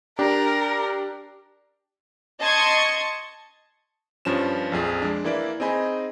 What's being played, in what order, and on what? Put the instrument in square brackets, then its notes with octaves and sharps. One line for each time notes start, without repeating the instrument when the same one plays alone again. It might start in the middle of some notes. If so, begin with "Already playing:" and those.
[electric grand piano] D4 G4 [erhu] A#4
[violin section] D#5 A5 C6 C#6 G#6
[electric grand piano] G2 F3 C#4 E7
A#1 F2 G#4
G#3 D4
E3 A#3 E4 D5
C4 D#4 G#4 D#5 G#5 B5